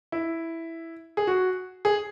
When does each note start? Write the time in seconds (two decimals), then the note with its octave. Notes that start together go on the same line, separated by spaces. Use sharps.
0.12 E4
1.17 G#4
1.27 F#4
1.85 G#4